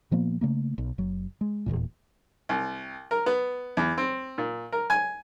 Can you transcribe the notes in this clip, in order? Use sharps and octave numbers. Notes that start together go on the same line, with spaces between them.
A#2 F3 A#3 B3
C#3 A3 A#3
B1
F#1 F#3
G#3
D#1 G#1 E2 A#2
C2
A#4
B3
E2
C4
A#2
A#4
G#5